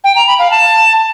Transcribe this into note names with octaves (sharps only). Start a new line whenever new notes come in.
G5
A#5
B5
F5
A5